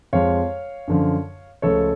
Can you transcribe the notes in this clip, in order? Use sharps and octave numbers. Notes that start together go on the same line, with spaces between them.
F2 F3 G#3 C#5 F5
F#2 D3 F3
C#2 C#3 F3 A3 A4 C#5